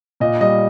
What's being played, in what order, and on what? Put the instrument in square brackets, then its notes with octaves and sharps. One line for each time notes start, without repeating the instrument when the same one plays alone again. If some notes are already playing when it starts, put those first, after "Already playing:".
[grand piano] A#2 [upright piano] D#5
[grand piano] G3 [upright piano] D#5